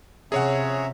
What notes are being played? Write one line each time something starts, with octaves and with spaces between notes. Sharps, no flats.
C3 F3 C#4 G#4 C#5 E5 F#5 A#5